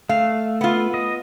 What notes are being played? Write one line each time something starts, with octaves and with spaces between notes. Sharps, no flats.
A3 F5
B3 F4
D#5